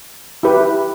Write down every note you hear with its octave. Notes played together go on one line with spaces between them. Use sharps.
E4 G4 B4